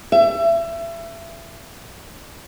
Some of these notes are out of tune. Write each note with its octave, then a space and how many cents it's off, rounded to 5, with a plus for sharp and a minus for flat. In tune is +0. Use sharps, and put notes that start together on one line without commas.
E5 +25